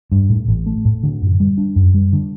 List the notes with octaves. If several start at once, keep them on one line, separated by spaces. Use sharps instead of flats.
G2
A2
A1
A3
A2
D3
F#2
G3
D4
F#2
G3
D3